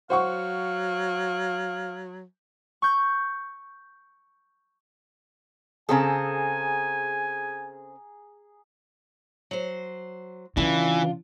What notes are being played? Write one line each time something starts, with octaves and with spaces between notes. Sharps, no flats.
F#3 C5 F5 F#5 C#6
C#6 G6
C#3 C4 G#4 A4 G#5 A#5
F#3 C5
C#3 E3 D4 F4